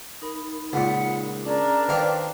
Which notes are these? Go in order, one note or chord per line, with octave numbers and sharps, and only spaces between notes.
D#4 A#4 B5
C#2 A#2 F#5
C#4 D4 G#4 A#4 D5 A#5
D#3 A#3 F4 B4 C5 G5